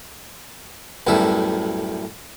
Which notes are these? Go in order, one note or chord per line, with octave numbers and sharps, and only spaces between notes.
B1 F#2 A2 G3 E5